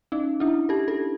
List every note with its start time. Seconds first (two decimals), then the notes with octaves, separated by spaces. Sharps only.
0.12 C#4 D#4
0.40 D4 E4
0.69 G4 A4
0.88 G4 A4